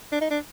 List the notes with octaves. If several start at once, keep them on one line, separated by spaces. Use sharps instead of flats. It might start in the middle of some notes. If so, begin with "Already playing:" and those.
D4
D#4
D4